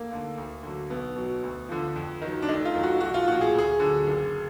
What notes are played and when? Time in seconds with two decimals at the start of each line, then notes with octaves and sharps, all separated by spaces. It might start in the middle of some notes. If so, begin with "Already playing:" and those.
Already playing: F1 A#3
0.11 D#2 D3
0.38 D2
0.63 D3 F#3
0.90 B1 B3
1.16 B2 F#3
1.43 D2
1.69 D3 F3
1.96 F2
2.21 D#3 F#3
2.42 D4
2.48 F1 D#4
2.65 F4
2.74 F2 D#3 F#3
2.83 F#4
3.01 B1 F#4
3.14 F4
3.27 A#2 F3 F#4
3.41 G#4
3.54 D2 G#4
3.80 D3 F#3
4.07 F#1